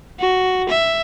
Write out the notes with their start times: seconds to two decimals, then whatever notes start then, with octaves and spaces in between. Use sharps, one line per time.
0.20 F#4
0.69 E5